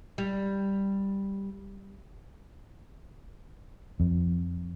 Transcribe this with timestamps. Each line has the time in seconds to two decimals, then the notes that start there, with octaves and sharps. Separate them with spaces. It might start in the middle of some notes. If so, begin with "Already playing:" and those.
0.18 G3
4.00 F2